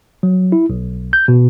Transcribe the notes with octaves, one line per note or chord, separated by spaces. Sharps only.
F#3
E4
B1
G6
B2